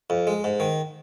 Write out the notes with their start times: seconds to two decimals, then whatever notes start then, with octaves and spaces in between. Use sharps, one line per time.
0.10 F2
0.27 G#3
0.44 G#2
0.60 D#3